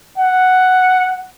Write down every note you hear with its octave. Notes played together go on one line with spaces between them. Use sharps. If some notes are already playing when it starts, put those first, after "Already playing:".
F#5